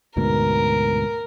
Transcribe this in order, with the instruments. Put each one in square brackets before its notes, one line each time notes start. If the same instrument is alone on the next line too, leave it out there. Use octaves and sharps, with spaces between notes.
[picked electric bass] D2 G#2 B2 [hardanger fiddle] A#4